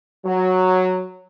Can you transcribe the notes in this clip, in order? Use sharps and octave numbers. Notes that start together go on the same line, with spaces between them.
F#3